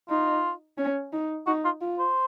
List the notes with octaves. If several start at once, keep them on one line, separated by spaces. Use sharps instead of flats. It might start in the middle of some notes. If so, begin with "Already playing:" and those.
D#4 F4
C#4
D#4
D#4 F#4
F4
F4
C5